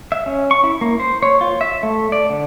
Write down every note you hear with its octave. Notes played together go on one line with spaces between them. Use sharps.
E5
C#4
C#6
E4
A#3
C5
C#5
F4
E5
A3
D5
D3